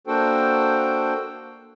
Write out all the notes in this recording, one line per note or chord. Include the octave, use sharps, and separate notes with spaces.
A#3 D4 F#4 A4 C5 G5